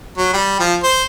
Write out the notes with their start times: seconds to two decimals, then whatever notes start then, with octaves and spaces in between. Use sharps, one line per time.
0.17 F#3
0.33 G3
0.60 F3
0.83 C5